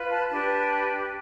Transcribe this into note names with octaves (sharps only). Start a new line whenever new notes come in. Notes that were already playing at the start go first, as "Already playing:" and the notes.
Already playing: F4 B4
A5
D4 G4 B4 A5